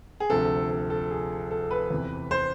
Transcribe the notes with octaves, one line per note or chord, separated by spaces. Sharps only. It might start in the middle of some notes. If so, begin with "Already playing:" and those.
G#4
D2 C3 F3 A4
A4
A4
G#4
A4
B4
E2 C3 E3
C5